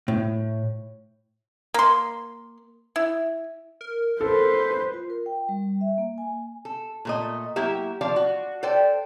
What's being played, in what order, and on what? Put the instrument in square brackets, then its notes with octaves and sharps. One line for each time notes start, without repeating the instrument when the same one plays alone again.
[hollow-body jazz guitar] A2
[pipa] A#3 C6
E4
[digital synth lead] A#4
[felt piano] A4 [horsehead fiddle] B4 C5
[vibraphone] F4
A#4
G5
G3
E5
A#3
G#5
[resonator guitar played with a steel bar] A4
A#2 A3 D#5
F#3 A#3 E4 G4 E5
F3 D5 F5
F#4
A4 C5 D5 G5